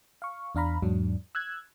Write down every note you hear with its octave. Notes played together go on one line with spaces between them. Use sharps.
F5 C#6
E2 D4 F5 A#5 B5
E2 G#2 F#3 D4
E6 F#6 G#6